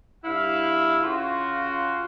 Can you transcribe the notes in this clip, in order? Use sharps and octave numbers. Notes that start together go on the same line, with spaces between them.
G2 E4 F5
C#3 F4 F#4